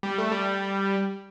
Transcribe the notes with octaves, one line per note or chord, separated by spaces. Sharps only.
G3
A3
G3